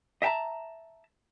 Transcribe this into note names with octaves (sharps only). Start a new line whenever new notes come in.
D#5 E5 G5 A5 A#5